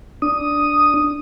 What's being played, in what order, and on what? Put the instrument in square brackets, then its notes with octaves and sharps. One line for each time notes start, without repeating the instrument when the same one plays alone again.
[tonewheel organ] D4 D#6